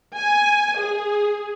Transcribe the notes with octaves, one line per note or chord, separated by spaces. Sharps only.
G#5
G#4